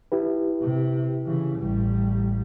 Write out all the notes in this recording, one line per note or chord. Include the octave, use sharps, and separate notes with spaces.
E4 G4 B4
C3
C#3 E3
A1 G3